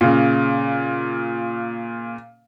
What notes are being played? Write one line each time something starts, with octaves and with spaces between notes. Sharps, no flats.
A#2 C#3